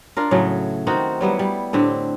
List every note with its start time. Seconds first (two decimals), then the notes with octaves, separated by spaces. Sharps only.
0.17 D4 F4 A#4
0.31 A2 C#3 F#3 A3
0.87 D#3 C4 D#4 F#4
1.21 F#3 G3 B3 E4
1.39 G3
1.73 A2 D3 C4 G4